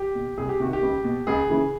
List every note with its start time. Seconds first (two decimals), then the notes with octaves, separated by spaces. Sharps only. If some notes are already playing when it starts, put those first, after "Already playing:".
Already playing: G4
0.15 B2
0.38 C2 G#4
0.49 G4
0.60 C3 D#3 F#4
0.73 G4
0.83 C#2
1.04 B2
1.27 C#2 G#4
1.50 C#3 E3